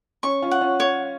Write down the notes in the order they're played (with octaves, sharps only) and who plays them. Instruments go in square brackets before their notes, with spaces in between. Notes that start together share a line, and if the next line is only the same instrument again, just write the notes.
[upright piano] C#4 [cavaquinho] C#6
[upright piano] C#4 F4
[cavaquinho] F#5
[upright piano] C#4 F4
[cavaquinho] C#5